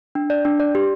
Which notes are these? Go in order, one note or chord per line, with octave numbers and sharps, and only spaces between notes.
D4
D5
D4
D5
G4